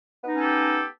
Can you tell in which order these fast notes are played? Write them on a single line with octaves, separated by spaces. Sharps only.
B3 D#4 C#4 A4 G4